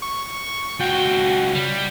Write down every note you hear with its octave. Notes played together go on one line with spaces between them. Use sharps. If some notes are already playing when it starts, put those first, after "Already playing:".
C#6
C#2 F#4 G5
G3